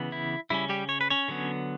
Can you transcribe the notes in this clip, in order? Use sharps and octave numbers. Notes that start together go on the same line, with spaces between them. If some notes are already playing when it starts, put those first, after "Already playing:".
Already playing: C#3 E3 B3
E4
C#3 G3 C#4 E4
G3 G4
C#5
B4
C#4 C#5
D3 F#3 B3